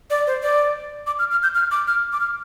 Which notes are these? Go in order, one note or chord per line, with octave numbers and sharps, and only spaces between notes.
D5
C5
D5
D6
F6
F6
G6
F6
D6
F6
D6
F6